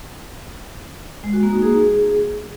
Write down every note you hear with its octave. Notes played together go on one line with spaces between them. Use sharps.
G#3
F#4
A#3
D#4
G#4